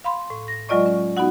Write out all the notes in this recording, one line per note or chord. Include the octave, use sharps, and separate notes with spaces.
F5 B5 C6
A2
A#6
F#3 G#3 F4 D5 D#5 C#6
C#4
B3 D#4 F#4 F#5